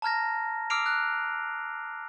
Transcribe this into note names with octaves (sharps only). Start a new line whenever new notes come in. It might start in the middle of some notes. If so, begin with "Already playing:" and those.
A5 A#5 F6 G#6 A#6
D6 E6 F6 C7 D7 F7
F#6